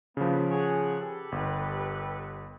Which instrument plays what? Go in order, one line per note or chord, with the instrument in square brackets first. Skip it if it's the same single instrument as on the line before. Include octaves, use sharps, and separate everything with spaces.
[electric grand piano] C#3 F3 [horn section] A#3 B3
[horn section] G#4 C#5 F#5
G4 A4 B4
[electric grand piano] G1